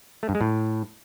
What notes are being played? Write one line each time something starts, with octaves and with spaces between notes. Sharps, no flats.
A3
G2
G#3
A2